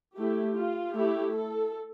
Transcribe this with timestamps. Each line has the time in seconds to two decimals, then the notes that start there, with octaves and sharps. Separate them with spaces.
0.16 A3 E4 G4
0.55 F4
0.95 A3 E4 G4
1.35 A4